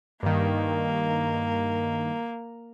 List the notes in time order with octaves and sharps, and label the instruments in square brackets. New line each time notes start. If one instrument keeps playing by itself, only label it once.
[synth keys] G2 D#3 [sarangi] A#3